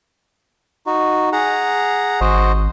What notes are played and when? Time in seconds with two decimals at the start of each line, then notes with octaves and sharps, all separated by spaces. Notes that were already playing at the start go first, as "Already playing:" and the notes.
0.86 D#4 F#4
1.33 G#4 F#5 A#5
2.21 G#1 F#4 C5 D#5